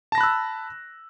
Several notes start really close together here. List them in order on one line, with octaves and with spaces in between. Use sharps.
A5 A#6 B5 F#6 E6